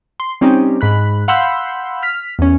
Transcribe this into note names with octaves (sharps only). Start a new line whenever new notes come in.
C6
G3 C4 C#4 D#4 G4
G#2 B5 F#6
F5 F#5 B5 C6 E6 G6
F6 B6
E2 C#4